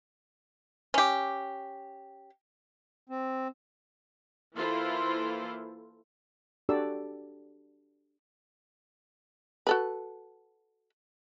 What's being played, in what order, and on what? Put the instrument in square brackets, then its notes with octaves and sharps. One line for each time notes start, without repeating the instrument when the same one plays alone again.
[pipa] C#4 G4
[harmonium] C4
[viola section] E3 A#3 E4 F4 A4 C5
[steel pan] D4 F#4 G4 A4 D5 E6
[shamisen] F#4 A4 B4